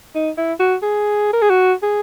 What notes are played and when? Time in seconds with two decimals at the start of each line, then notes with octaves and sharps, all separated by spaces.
0.15 D#4
0.37 E4
0.59 F#4
0.82 G#4
1.33 A#4
1.41 G#4
1.50 F#4
1.82 G#4